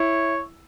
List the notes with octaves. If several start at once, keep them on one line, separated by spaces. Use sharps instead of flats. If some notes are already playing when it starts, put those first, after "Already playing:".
Already playing: E4 C#5